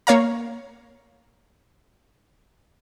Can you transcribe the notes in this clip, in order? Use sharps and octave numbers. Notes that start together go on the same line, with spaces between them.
A#3 C#5 F5 A#5